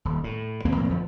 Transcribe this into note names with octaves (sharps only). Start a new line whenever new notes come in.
D#1
A2
E2 E3 A#3 C4
A2 F3 A#3 C4
G1 F2 F3